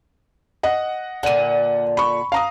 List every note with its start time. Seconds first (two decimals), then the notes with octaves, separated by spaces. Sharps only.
0.63 D#5 F#5
1.23 A#2 D3 F#5 D#7
1.97 B5 C#6
2.32 F5 A#5 D#6